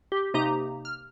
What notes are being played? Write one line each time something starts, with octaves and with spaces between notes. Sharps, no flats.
G4
C3 A#3 D#4 G4 A#5
F6